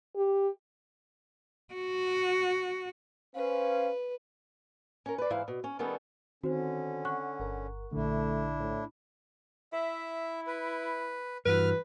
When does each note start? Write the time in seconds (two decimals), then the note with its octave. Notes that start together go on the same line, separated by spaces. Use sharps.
0.16 G4
1.74 F#4
3.35 C#4 B4 C5 F5
5.06 C#4 A#4
5.18 B4 D5
5.30 G#2 E3 E4 F5
5.48 B2
5.64 C#4
5.79 D#3 G3 B3 C#4 A4
6.44 D3 D#3 C4 C#4 F#4 C5
7.05 F#5 C#6 F#6
7.40 G1 A#4
7.93 A#1 D3 A3 D4 E4
8.60 A2
9.73 E4 E5
10.47 B4
11.45 G2 E3 F#4 B4 F6